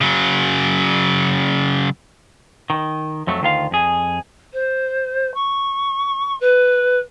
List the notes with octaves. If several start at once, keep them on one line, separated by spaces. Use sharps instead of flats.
C#3 F#3
D#3
F2 F#3 A3
D2 D#3 F4 F5
F2 G#4
C5
C#6
B4